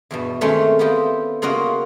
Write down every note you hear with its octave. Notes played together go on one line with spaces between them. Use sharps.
E2 G2 B2
D#3 G#3 A3 C4 C#4 D#4
B3 E4 F4 G4 D#5
C#3 A#3 F4 F#4 D#5